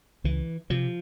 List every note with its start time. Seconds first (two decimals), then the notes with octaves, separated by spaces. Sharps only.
0.24 C#2 E3
0.70 C3 F3